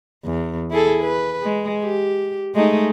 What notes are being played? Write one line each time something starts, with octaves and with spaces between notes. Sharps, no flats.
E2
E4 G#4 A4
B4
G#3
G4
G#3 A3 D#4